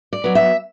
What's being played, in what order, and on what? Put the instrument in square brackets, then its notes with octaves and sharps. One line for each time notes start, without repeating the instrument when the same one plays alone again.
[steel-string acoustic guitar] D5
F#3 B3
E5